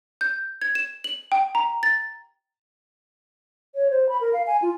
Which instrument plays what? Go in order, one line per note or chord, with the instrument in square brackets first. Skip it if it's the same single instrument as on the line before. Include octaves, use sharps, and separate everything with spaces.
[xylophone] G6
G#6
E7
F#7
G5
A#5
A6
[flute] C#5
C5
B5
A#4
F5
G#5
F4